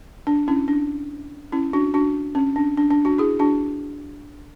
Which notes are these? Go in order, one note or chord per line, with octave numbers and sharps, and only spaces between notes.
D4
C#4 E4
D4
C#4 E4
D4 F#4
D4 F#4
C#4
D4
D4
D4
D4 F#4
E4 G#4
D4 F#4